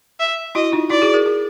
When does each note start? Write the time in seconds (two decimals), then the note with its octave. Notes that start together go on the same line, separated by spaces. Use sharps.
0.20 E5
0.55 E4 F#4 D#5
0.72 D#4 F4
0.90 E4 F#4 D5
1.02 F#4 G#4
1.14 G#4 A#4
1.26 G#4 A#4